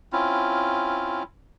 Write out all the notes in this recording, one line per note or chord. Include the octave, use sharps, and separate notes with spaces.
C4 C#4 E4 F4